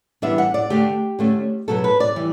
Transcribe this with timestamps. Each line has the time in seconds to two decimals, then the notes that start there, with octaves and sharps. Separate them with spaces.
0.22 E3 G3 B3 D4 E5
0.38 F#5
0.54 D5
0.70 D3 A3 D4 G4
1.19 D3 A3 C#4
1.68 B2 F#3 B3 A4
1.84 B4
2.00 D5
2.16 E3 G3